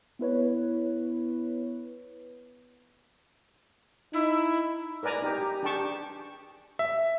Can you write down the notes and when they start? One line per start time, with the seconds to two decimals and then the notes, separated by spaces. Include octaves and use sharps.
0.19 B3 E4 B4 C#5
4.13 D#4 E4
5.03 A#4 B4 D5 G#5 A#5
5.22 D#4 G4
5.42 G4
5.63 D4 G4 G#4 G5 A5 C#6
6.79 E5